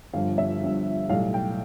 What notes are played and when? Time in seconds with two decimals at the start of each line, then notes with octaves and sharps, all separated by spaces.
0.13 G1 G2 F3 F5
0.38 E5
0.61 G1 G2 F3
1.09 B1 A2 G3 F5
1.34 G5